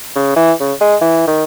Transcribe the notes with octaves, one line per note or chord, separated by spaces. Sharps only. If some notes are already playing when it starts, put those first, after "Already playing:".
C#3
E3
C#3
G#3
E3
D#3